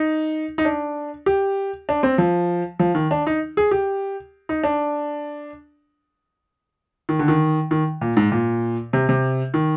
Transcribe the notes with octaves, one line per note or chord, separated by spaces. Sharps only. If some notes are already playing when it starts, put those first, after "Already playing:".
Already playing: D#4
D#4
D4
G4
D4
C4
F3
F3
D#3
D4
D#4
G#4
G4
D#4
D4
D#3
D3
D#3
D#3
A#2
G#2
A#2
C3
C3
D#3